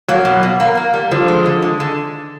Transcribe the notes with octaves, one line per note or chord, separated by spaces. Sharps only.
F#3 A#3
B2
B2
A#3
A#3
G3
D3 F3
G#3
D3
G#3
D3